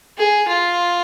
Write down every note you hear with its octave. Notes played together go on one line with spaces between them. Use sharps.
G#4
F4